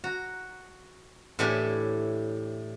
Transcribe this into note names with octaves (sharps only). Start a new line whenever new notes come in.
F#4 A#5
A2 E3 D4 G4 C#5 G#5